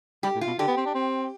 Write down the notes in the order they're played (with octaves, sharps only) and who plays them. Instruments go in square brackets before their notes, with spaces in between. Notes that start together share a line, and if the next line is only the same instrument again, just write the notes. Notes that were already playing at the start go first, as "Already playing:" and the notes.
[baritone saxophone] G3 [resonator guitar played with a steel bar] G4
[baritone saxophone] A2
[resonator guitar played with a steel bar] F4
[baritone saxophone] B2
[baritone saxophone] D3 [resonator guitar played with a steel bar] G4
[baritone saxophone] B3
C4
D4
C4